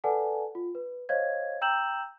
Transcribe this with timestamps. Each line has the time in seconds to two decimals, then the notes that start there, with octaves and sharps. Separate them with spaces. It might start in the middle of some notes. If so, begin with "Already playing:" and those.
0.04 A4 B4 D5 F#5 G#5 A5
0.55 F4
0.75 B4
1.09 C5 C#5 D#5 F5 G#6
1.61 G5 A#5 E6 G6 E7 F#7